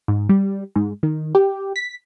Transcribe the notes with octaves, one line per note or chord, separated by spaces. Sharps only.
G#2
G3
G#2
D#3
G4
B6